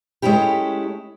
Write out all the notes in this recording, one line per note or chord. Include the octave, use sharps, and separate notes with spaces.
G#3 A3 C#4 E4 G4